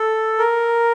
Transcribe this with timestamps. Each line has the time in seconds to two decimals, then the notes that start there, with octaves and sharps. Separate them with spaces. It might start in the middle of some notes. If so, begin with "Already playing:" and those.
Already playing: A4
0.39 A#4